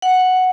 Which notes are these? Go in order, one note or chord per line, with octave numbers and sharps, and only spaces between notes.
F#5